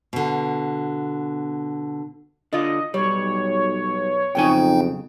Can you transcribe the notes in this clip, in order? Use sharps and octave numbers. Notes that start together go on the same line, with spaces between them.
B2 D3
D3 F4 D#5
B1 G3 C#5
B1 F2 C#3 D#4 G5 G#5